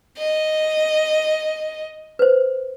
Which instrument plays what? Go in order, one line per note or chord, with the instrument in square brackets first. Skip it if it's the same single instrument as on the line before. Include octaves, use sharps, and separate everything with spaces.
[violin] D#5
[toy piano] B4 C5